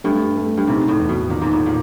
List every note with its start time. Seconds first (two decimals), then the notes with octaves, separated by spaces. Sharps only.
0.04 G2 A3
0.36 A3
0.57 G2
0.67 G#2 C3
0.88 A2
0.99 E2
1.09 B2
1.30 A#2 D#3
1.41 G#2
1.52 A2
1.66 A#2